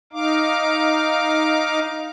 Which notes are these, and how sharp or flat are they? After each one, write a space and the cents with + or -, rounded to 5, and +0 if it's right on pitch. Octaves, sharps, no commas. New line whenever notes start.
D#4 +0 F5 +0 D6 +0